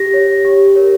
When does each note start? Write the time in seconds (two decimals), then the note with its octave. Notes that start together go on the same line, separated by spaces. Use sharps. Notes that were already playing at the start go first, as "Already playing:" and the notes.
Already playing: G4 A#6
0.14 C#5
0.45 G4
0.75 A#4 C#5